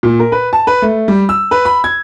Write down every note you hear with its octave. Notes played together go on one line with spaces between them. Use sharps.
A#2
A#4
B4
A5
B4
A3
G3
E6
B4
B5
G#6